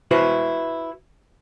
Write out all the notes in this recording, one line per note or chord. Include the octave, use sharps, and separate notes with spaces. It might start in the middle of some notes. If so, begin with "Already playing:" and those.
E4 F#4 B4 C5